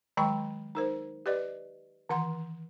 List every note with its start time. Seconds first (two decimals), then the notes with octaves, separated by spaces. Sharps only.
0.17 D#3 F#3 G#3 G5 B5 C#6
0.75 D#4 A#4 C5
1.26 G4 B4 D5 D#5
2.09 D#3 E3 F#5 C6